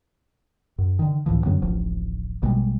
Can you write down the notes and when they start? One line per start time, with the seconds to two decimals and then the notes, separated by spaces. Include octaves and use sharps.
0.78 F#2
0.99 D3 D#3
1.26 C#2 A2 E3 F3
1.46 F#2 D3 F#3 B3
1.62 D1 A1 F3
2.42 A#1 B2 G3 G#3